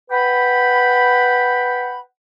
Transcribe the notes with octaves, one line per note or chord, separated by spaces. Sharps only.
B4 F#5 G5 B5